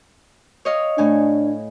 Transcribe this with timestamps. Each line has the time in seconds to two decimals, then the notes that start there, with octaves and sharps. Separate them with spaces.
0.65 C#5 D#5 F5
0.98 A2 D4 G#5